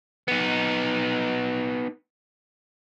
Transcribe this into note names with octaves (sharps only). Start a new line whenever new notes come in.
B3 D#4